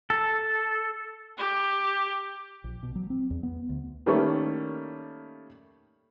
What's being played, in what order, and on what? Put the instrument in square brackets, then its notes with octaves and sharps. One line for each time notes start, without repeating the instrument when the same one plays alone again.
[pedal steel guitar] A4
[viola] G4
[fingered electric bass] A#1
B2
F#3
C4
E2
B3
D2
[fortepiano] D#3 G3 A3 A#3 C#4 C#5